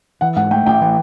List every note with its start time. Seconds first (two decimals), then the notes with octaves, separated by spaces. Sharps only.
0.21 E3 F#5
0.36 G#2 F#5
0.51 A3 G5
0.66 A1 G5
0.81 E3